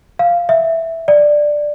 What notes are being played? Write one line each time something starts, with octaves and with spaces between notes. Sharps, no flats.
F5
E5
D5